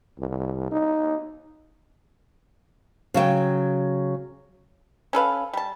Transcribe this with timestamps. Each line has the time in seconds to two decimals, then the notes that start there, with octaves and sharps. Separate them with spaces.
0.19 C2
0.71 D#4
3.14 C#3 F#3 E5 G5
5.13 C#4 A4 B4 F5
5.53 G3 A5